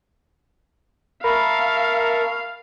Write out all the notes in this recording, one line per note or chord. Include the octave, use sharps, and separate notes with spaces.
A#4 E5 F5 A5 B5 C#6